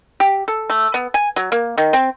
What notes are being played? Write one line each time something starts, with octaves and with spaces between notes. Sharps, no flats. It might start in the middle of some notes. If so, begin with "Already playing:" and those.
G4
A4
A3
B3
G#5
F#3
A#3
D#3
C4